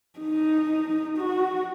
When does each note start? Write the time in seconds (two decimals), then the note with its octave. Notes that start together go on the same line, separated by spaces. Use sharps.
0.19 D#4
1.17 F#4